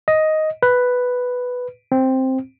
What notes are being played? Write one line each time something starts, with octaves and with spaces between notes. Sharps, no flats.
D#5
B4
C4